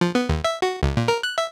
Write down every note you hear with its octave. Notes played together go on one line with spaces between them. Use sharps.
F3
B3
D#2
E5
F#4
C#2
A#2
A#4
F#6
E5